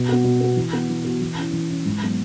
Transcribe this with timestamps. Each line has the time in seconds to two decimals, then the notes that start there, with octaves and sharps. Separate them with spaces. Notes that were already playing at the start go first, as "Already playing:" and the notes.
Already playing: B2
0.09 B3 F#4
0.24 B2
0.41 B3 F#4
0.57 E3
0.73 B3 F#4
0.90 E3
1.05 B3 F#4
1.21 E3
1.37 C#4 E4
1.53 E3
1.70 C#4 E4
1.86 G#2
2.02 F#3 B3